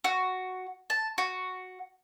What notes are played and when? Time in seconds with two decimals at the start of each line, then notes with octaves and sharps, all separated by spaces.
0.04 F#4
0.90 A5
1.18 F#4